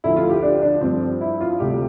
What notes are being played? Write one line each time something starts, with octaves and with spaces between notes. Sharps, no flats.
D2 D3 F3 E4
F4
G4
D4
D4
G2 F3 C4
E4
F4
D2 C3 G3 G4